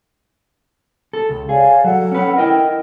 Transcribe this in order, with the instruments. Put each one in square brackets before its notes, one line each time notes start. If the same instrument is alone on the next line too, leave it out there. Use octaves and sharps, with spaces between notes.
[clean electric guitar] A4
C#2
[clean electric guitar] G#4 [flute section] C#5 D5 F5
[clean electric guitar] F#3 [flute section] A4 F#5
[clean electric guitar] C#4 B4
[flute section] E4 [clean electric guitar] A#4 D#5 G5